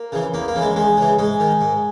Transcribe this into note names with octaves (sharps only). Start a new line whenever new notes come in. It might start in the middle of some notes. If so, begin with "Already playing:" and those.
Already playing: A#3
C#3 E3
E2 A#3
A#3
C#3 E3
G#3
E2 G#3
C#3 E3
G#2 G#3
D#3
G#2